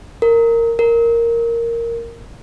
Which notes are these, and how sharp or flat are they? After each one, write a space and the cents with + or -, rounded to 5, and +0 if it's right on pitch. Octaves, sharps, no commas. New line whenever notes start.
A#4 -15
A#4 -5